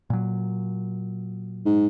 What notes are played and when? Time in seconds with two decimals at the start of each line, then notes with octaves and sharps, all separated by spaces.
0.10 A#2 F#3
1.66 G#2